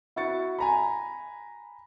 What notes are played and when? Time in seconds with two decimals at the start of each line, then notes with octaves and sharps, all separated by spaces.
0.16 E4 F#4 C#6 A6 C#7
0.59 G#5 A#5 B5